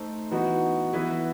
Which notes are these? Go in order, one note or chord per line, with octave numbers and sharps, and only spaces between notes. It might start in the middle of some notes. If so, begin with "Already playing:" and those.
Already playing: A3 D#4 A4 C5
E3 B3 D#4 F#4
E3 B3 E4 B4